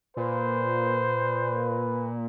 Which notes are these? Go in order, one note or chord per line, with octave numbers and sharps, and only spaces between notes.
A#2 B4 C5